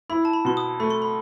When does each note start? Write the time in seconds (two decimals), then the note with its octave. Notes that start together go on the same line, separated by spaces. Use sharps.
0.10 E4 B5
0.25 A5
0.33 B5
0.45 B2 C6
0.57 D#6
0.80 A3 B5
0.90 C6
1.02 B5